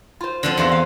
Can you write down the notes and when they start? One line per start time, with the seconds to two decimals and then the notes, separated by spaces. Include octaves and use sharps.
0.21 F4 C5
0.43 D3 F3 C4
0.57 E2 F4 G4 C5 F5 A#5
0.69 C#4 F5